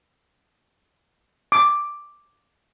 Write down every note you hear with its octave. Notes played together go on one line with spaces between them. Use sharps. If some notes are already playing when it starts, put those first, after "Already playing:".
D6